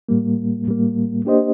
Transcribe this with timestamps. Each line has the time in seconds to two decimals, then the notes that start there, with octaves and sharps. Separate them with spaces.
0.09 A2 G3 A#3
0.67 A2 G3 A#3
1.25 A#3 D4 G4 C5 D#5